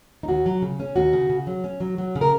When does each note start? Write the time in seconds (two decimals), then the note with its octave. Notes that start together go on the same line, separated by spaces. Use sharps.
0.23 D#4
0.28 D#2 F#4
0.46 F#3
0.62 C#3
0.80 C#4
0.96 D#2 F#4
1.13 C#3
1.30 C#3
1.47 F#3
1.64 C#4
1.80 F#3
1.98 F#3
2.16 C#3
2.21 A#4